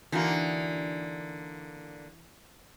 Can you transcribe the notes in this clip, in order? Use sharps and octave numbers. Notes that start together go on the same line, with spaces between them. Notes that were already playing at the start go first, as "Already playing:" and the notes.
D3 E3 A#3 D#4 F#4